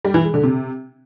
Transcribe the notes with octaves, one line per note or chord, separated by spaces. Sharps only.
G3
E3
G#3
D3
C3